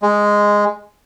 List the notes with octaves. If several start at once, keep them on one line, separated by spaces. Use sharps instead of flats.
G#3